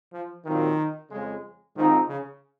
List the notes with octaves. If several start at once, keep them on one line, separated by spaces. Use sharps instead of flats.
F3
A#2 D#3 F#3 C4 F4 A#4
F2 C#3 G#3
G#2 D#3 F3 C4 D#4
C#3